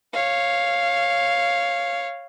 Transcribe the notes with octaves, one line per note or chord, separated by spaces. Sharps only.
C#5 F5